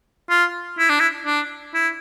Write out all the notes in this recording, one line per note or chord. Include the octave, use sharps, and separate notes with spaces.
F4
E4
D4
E4
D4
E4